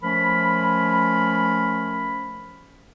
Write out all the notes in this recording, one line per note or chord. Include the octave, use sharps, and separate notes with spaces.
F3 A3 C#4 A#4 B5